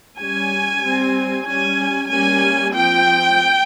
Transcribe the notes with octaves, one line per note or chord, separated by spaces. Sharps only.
G3 C#4 G#5
G3 C4
G3 C#4 G#5
G3 A#3 C#4 G#5
F3 C4 G5